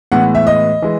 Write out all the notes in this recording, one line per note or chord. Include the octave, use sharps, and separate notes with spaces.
A2 E3 G#3 B3 F#5
E5
D#5
E3 G#3